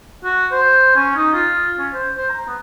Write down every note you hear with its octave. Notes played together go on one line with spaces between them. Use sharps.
F#4
C5
C#4
D#4
F4
C#4
C5
C5
A#5
B3